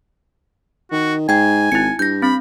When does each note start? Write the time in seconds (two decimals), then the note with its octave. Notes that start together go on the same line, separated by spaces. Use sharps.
0.91 D#3 F#4
1.29 G#2 G5 G#5 G#6
1.72 G#1 E4 C#7
1.99 G2 G6 A#6
2.22 C4 B5